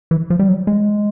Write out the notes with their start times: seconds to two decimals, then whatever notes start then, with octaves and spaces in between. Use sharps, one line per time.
0.11 E3
0.30 F3
0.39 G3
0.49 F#3
0.67 G#3